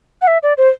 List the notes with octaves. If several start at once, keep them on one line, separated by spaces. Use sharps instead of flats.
F#5
E5
D5
C5